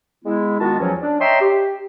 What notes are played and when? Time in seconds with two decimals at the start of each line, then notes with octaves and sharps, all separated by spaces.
0.25 G#3 B3 E4
0.60 D#3 G#3 B3 F4 F#4 A5
0.79 E2 F3 F#3 C#4
1.01 D4
1.20 C#5 D#5 E5 G5 A#5 C6
1.41 G4